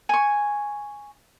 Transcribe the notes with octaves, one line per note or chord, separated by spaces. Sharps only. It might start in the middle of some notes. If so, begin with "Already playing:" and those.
G#5 C#6